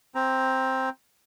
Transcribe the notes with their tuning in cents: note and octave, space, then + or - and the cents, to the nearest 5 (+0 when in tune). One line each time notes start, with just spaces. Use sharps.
C4 +5 A#5 +10